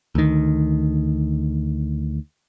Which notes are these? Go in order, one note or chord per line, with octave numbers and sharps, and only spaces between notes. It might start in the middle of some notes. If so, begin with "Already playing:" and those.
D2 D#3